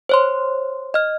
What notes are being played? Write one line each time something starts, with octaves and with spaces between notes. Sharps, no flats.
C5 C#5 C6
D#5 F6